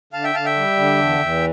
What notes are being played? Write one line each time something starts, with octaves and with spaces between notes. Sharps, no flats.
D3 F5 A5
E5 G5
D3 F5 A5
E5 G5
G3
D3
E2
E2